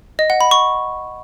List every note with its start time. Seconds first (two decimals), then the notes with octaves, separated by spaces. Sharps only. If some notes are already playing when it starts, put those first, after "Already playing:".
0.19 D#5
0.30 F#5
0.41 B5
0.51 C#6